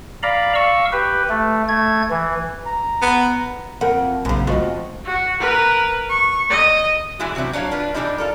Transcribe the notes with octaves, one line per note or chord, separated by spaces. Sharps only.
D5 F5 A#5 B5
F5 C#6 E6
G4 B4
A3
A3 G#6
E3
A#5
B3
F2 A#4 F#5
A#1 F#2 C#3
F2 G#3 B3 F4 F#4 D#5
F#4
A#4 B4
C#6
D#5
D3 E3 G#3 E4 F#4
C3 F#3 B3 C4 E4
F#3 D4 C#5 F5
D4 F4 B4
D3 E3 F3 G3 D4 D#4
F4 A4 A#4